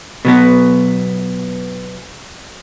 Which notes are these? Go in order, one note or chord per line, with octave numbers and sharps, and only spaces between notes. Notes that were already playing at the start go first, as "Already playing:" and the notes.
B2 F#3 B3